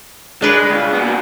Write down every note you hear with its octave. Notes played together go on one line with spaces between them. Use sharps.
G#3 D4 B4
C#2
A#2 B3